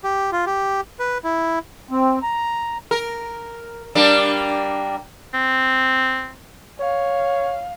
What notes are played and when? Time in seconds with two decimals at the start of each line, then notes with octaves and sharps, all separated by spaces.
0.04 G4
0.32 F4
0.46 G4
0.99 B4
1.24 E4
1.91 C4
2.23 A#5
2.91 A#4
3.95 G3 A#3 D4
5.34 C4
6.80 C#5 F5